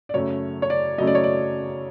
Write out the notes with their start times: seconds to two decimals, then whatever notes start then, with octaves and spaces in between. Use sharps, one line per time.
0.09 D5
0.14 F#2 C#3 F#3 A3 C#5
0.62 C#5
0.70 D5
0.98 F#2 C#3 F#3 A3 D#5
1.07 D5
1.15 C#5
1.24 D5